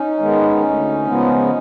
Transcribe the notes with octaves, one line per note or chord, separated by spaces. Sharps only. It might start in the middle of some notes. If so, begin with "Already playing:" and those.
Already playing: C#4 D#4
D#3 G#3 B3
D2
C#3 F3 G#3 B3